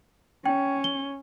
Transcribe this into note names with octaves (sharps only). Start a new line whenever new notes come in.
C#4 G5
G7